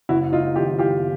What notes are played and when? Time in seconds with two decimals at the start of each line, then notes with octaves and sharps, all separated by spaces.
0.09 F#1 E4 F#4
0.32 D#4 F4
0.55 F#2 D#3 F4 G4
0.79 F4 G4